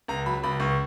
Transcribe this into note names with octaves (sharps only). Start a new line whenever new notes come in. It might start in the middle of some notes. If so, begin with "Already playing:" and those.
C#2 A#5
F#3 B5
C#2 B5
C#2 C#6